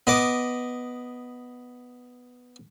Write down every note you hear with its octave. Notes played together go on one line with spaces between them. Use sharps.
B3 D#5 D6